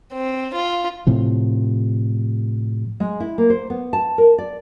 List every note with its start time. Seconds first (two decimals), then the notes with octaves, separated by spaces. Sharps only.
0.13 C4
0.55 F4
1.07 A2 C3 F3
3.00 G#3
3.20 E4
3.38 A#3
3.50 C5
3.70 B3
3.93 A5
4.18 A#4
4.38 D5